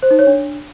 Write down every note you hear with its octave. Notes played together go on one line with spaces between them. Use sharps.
C5
D#4
C#5
D4